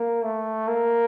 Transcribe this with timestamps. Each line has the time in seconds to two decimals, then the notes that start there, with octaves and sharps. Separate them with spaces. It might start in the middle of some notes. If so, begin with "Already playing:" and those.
Already playing: A#3
0.24 A3
0.68 A#3